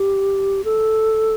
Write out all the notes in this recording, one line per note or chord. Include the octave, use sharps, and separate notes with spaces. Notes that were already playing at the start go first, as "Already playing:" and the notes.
Already playing: G4
A4